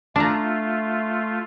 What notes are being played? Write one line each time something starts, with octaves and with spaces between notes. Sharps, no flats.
A3 D4 F4 A#5